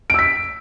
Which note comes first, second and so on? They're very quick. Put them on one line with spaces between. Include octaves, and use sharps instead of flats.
D7 E6 B6